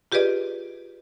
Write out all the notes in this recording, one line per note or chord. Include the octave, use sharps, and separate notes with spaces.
F4 G4 G#4 B4 D5 D#5